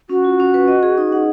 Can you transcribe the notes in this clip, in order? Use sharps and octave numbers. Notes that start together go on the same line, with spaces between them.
C#4 F#4
F4
C#4
B4
D#5
G#4
D#4
F#5